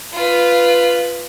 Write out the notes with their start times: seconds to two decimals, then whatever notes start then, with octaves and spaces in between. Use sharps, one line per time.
0.14 F4 B4